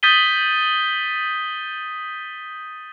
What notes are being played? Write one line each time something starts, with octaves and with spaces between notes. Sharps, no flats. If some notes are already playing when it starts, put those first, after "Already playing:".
D#6 G6 A6 B6 D#7 G7